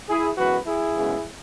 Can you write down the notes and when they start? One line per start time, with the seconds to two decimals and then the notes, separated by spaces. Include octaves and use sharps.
0.09 E4 G#4
0.38 F#2 E3 G#3 B3 F#4 B4
0.67 E4 G#4
0.94 F#2 C#3 G#3 B3